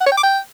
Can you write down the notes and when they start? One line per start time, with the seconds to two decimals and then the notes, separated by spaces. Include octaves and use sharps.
0.01 F#5
0.06 C#5
0.12 G5
0.18 D6
0.23 G5